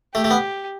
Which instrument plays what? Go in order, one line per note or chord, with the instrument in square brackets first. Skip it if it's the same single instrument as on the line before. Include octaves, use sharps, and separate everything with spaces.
[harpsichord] A3 [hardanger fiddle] G4
[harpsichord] A3
B3